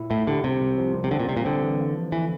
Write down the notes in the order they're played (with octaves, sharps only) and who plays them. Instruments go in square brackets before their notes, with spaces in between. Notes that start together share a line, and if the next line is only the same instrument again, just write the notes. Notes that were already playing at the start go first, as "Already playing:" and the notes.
Already playing: [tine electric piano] A#2 E4
[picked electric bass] A2 [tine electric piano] E4
[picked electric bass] D3 [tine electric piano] G4
[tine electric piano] C2 [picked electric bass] C3
[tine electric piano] C2
F3
C2
[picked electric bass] C3
[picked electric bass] D3 [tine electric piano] C4
[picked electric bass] A#2
[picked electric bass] C3 [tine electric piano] G3
[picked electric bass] A#2
[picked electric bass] D3 [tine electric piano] C4
[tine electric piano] E3
A#3
F3
[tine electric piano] D3 [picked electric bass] E3